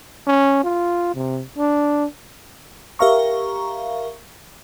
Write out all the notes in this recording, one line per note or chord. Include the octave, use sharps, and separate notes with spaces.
C#4
F4
C3
D4
G4 A#4 E5 F5 A#5 C#6